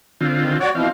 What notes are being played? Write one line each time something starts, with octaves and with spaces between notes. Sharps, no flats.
D3 C4 F4
D#3 G#3
F#4 C#5 D5
B2 E3 F3 C4 F5